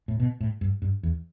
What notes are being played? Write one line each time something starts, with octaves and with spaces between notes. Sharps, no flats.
A2
B2
A2
G2
G2
E2